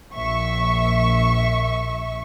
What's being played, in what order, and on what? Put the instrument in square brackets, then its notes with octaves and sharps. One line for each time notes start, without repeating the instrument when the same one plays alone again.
[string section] A#1 E5 C#6